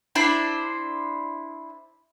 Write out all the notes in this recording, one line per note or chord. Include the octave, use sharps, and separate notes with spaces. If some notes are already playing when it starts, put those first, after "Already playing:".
D4 E4 C5 B5